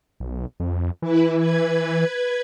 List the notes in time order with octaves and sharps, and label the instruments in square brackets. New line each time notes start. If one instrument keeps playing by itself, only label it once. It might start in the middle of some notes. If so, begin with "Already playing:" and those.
[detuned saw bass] B1
F2
[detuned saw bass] E3 [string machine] E4 B4
[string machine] B4 G#6